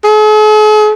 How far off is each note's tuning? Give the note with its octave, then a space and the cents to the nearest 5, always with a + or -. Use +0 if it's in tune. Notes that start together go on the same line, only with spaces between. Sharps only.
G#4 +45